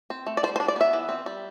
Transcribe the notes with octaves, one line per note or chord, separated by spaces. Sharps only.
C4
A3
D5
G3 C5
C5
D4
D5
B3 E5
E3
C4
G3